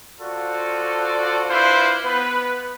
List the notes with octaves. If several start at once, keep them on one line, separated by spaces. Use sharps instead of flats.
F4 F#4 A4 C5 D5
D4 E4 F4 B4 C5
B3 B4